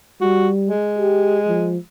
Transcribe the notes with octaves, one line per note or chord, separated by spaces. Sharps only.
G3 F#4
G#3
G4
F3